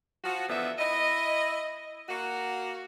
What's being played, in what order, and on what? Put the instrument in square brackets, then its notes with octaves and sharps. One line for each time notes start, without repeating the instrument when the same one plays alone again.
[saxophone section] F3 F#4
E2 D3 F3 B3 E5
E4 D#5
A#3 F#4